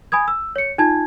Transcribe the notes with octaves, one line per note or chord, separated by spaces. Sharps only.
G#5 B5 D#6 G#6
E6
C#5 C#7
D#4 F4 A5 G#6